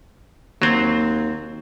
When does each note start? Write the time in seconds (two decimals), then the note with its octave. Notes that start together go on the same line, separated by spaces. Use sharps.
0.62 D#2 F#3 C4